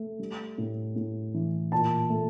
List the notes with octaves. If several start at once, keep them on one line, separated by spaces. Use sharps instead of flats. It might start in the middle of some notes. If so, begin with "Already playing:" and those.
Already playing: A3
G3
A2
A2
E3
A#2 A5
A3